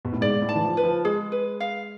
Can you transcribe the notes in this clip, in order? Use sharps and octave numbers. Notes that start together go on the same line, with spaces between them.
B2
A2
G#2 D5
A2
A5
E3
F3
B4
F3
G#3 G#4
B4
F5